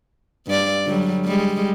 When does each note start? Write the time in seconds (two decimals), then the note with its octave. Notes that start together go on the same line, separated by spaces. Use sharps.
0.47 G2 D5
0.85 D3 F#3 G3
1.25 G3 G#3